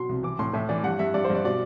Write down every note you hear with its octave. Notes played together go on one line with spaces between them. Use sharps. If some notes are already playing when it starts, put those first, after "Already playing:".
Already playing: B2 F#3 C6
C2
E3 D6
A2 C6
A2 E5
E3 D5
G2 F#5
G2 E5
G2 D5
C5
G2 D5
B2 D5